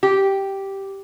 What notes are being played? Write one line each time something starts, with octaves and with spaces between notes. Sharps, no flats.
G4